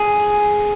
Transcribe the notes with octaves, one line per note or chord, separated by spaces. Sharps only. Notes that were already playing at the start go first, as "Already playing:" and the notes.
Already playing: G#4